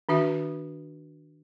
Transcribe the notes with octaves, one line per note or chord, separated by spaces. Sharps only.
D#3 D4 F#4 E5